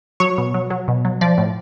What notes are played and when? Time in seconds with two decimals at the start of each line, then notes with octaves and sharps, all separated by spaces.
0.20 F#3 C#5
0.38 B2
0.54 F#3
0.70 F#3
0.88 B2
1.05 F#3
1.21 F3 D5
1.38 A2